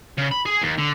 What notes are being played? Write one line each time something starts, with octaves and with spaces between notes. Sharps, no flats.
C#3
B5
G#4
D#2
D3